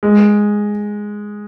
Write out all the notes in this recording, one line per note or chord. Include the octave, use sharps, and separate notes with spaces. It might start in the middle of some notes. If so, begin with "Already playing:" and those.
G#3